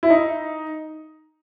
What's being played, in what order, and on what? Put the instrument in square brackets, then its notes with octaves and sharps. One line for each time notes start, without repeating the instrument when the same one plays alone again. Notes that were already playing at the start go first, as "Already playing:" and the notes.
[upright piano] E4
D#4